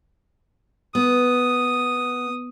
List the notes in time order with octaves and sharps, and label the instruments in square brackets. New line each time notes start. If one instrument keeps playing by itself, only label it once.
[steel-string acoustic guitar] B3 [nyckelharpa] D#6